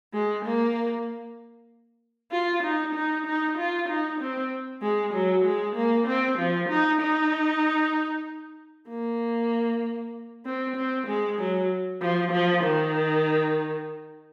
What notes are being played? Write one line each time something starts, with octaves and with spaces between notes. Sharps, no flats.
G#3
A#3
F4
D#4
D#4
D#4
F4
D#4
C4
G#3
F#3
G#3
A#3
C4
F3
D#4
D#4
A#3
C4
C4
G#3
F#3
F3
F3
D#3